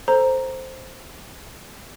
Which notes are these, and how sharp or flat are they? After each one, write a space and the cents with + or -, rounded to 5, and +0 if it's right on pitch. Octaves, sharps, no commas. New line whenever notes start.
A4 +0 C5 +0 A#5 +0